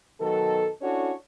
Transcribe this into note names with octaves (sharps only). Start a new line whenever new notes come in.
B2 D#3 F#3 A4
C#4 D4 E4 F#4 A4 C#5